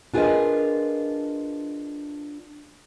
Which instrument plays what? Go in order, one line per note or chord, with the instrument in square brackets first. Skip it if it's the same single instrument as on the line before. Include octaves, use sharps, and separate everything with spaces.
[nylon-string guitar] D4 F4 G#4 A#4 B4 D#5